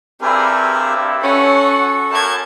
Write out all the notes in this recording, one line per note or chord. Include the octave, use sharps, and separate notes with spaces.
G2 C4 E4 G4 G#4 A#4
C#4 F#4 A4 F#5
F#2 A5 G#6